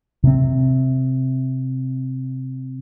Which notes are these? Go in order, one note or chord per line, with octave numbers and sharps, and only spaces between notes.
C3 C4